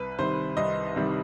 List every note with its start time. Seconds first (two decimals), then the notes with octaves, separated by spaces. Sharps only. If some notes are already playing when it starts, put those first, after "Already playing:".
Already playing: C2 B4
0.19 C3 D#3 G3 C5
0.57 C2 D#5
0.96 C3 D#3 G3